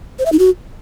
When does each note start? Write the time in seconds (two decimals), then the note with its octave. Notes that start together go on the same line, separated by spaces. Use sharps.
0.19 C5
0.26 E5
0.32 D#4
0.39 F#4